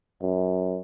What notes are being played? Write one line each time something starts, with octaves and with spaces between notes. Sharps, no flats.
F#2